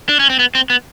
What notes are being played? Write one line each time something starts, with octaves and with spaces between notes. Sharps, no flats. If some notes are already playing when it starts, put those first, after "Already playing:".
D4
C#4
C4
B3
C4
B3